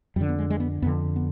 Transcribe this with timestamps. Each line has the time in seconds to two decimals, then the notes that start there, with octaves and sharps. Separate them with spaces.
0.16 F2 G3
0.21 D3
0.29 B3
0.39 G#3
0.50 G#3
0.60 B3
0.82 F2 D3 B3
1.16 B3